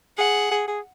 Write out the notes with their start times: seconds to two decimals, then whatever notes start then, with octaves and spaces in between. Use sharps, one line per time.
0.18 G#4 F#5
0.52 G#4
0.68 G#4